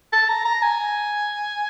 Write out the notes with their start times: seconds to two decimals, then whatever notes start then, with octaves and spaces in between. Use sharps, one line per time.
0.13 A5
0.29 A#5
0.45 A#5
0.63 G#5